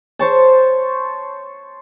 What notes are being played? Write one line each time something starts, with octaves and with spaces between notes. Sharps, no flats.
C5 C#5 A5